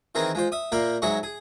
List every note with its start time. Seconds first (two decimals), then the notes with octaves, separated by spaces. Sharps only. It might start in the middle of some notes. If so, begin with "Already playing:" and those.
0.15 D#3 E3 C4 G#4 A#4
0.35 G#3 F4 C5
0.52 E5 D#6
0.72 A#2 A#3 E5 F5 G5 B5
1.02 G#2 F#3 G#4 D#5 E5 C#6
1.23 G#4